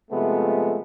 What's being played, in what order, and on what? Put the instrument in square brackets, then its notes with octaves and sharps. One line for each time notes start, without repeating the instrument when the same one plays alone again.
[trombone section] C3 F3 G#3 A3 B3